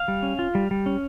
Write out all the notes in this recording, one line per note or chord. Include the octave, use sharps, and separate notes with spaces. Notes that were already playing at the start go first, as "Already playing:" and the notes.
Already playing: F5
G3
C#4
F4
G3
G3
C#4